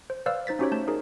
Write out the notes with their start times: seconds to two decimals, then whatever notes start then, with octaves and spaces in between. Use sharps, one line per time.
0.10 C5
0.26 B4 C5 D5 F5 E6 F6
0.47 D#4 C5 A6 B6
0.59 C#4 D#4 F#4 G4 C5 C#5
0.72 A3 A5 G6
0.88 D#4 G#4 A#4